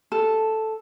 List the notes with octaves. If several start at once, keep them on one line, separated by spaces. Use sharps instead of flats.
A4